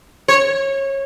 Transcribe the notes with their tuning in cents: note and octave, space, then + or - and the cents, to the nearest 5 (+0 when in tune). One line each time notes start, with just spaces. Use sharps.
C#5 -25